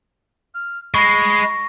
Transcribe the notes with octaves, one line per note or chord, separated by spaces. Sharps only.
F6
G#3 B5 C#6 A#6